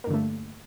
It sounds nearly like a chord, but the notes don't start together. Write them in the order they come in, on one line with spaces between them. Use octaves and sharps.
A#3 G2 D3 A3